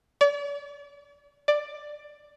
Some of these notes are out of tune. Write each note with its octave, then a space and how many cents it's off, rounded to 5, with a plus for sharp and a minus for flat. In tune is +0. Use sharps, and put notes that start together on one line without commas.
D5 -40
D5 +10